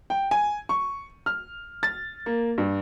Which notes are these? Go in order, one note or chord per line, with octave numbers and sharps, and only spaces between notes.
G5
G#5
C#6
F6
A6
A#3
G2